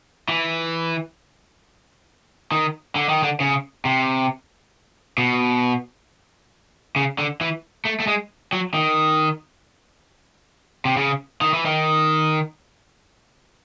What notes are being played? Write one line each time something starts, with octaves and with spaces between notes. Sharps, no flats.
E3
D#3
D3
D#3
D3
C#3
C3
B2
C#3
D3
E3
A3
A3
G#3
F#3
D#3
C3
C#3
D#3
E3
D#3